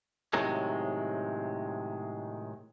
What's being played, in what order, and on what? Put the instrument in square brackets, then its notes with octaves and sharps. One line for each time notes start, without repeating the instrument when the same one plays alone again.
[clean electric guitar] A2 C3 D#3 F#3 G#3